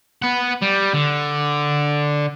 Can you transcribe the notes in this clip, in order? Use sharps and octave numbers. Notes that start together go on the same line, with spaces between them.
B4 F#5
G3
D3